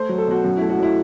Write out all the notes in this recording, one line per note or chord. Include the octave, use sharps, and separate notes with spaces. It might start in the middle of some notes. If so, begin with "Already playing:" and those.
Already playing: A3 C5
F#3
A4
B2 F#4
F#2 F#4
A3 E4
F#4
F#3 E4